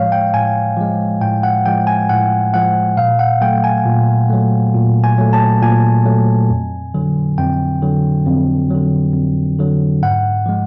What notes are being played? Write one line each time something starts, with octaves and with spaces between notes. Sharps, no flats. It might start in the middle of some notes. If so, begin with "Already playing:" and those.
Already playing: A2 F3 G#3 C#5 F5
G5
A2 G#5
F3 G#3
A2 G5
F#5
F3 G#3 G5
G#5
A2 F#5
F3 G#3 F#5
A#2 F5
F#5
F#3 A3 G5
G#5
A#2
F#3 A3
A#2
G#5
F#3 A3
A5
A#2 G#5
F#3 A3
F2
D3 F#3
F2 G5
D3 F#3
F2
D3 F#3
F2
D3 F#3
G#2 F#5
F3 G#3